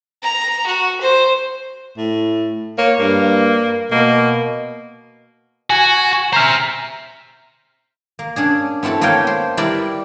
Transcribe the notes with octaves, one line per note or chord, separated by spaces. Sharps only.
A#5
F#4
C5
A2
A#3 C#5
G2 A#3
B2 A#3
F#4 G#5
C5 E5 A#5 F6
A#3
C#4 D4 G#4
B3 C4 E4 F#4 A4
A#3 B3 A4 C#5 F5 G5
C5
G3 E4 A#4 B4 D5